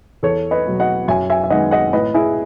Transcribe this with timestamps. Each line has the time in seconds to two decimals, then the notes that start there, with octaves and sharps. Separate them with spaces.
0.23 E2 A4 C#5
0.51 B4 D#5
0.66 B2 F#3
0.80 D#5 F#5
1.08 F#2 E5 G#5
1.30 E5 G#5
1.44 E5
1.50 D#3 G#3 B3 D#5 F#5
1.71 D#5 F#5
1.93 A2 B4 D#5
2.14 E4 G#4